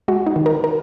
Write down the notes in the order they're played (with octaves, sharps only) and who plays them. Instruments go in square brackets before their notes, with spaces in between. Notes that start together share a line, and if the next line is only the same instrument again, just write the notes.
[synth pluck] G#3 F#4
D#4
D#3
A#4
A#4